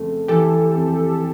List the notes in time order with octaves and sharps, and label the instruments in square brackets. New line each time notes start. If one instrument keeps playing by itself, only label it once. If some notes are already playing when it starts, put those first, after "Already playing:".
Already playing: [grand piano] F2 C#3 A3
[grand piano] E3 [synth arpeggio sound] G4 A4
[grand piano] F2